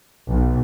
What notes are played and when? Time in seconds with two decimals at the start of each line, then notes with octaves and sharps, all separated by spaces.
0.30 B1